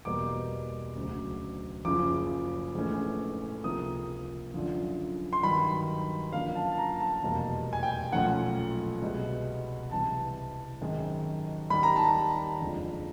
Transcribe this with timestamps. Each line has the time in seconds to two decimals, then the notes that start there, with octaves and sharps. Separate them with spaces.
0.05 E2 B2 G3 A#3 D6
0.96 D2 C#3 F#3
1.85 F#1 F#2 C#3 F3 D6
2.75 A#1 G#2 E3 A3 C#4
3.64 C#2 C3 F3 A#3 D#6
4.54 F#2 D3 F3
5.33 C6
5.43 G2 D#3 F#3 B5
6.33 F#2 D3 F3 A#3 F5
6.55 A5
6.72 A5
6.78 A#5
7.00 A5
7.22 F1 E2 B2 G3 A#3 A5
7.73 G#5
7.83 G5
8.12 B1 A#2 F3 A3 C#4 F#5
9.02 C2 B2 G#3
9.91 C2 C3 E3 A5
10.81 G#1 F#2 D#3 G#3
11.70 D#2 D#3 G3 B5
11.83 A#5
11.96 A5
12.08 A#5
12.60 F#1 F2 D3 F3 G#3